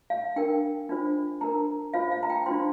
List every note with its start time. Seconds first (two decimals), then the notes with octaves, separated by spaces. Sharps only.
0.10 F5
0.36 D4 A#4 G5
0.89 D4 F4 C5
1.41 D4 A#4 A#5
1.94 F4 C5 F5
2.11 F5
2.23 A#5
2.30 G5
2.46 D4 F4 C5 C6